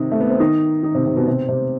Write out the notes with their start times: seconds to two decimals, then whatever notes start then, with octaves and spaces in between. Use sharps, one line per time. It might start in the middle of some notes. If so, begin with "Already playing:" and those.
Already playing: C3 D#3 C4 D#4
0.12 A3
0.20 B3
0.30 C4
0.40 D#3 D#4
0.83 D#3 D#4
0.95 C3 C4
1.06 C3 C4
1.16 B2 B3
1.27 C3 C4
1.48 C3 C4